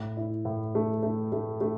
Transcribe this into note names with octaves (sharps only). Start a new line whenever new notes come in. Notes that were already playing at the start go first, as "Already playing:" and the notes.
Already playing: A2
E4
A2
A3
A3
A3
A3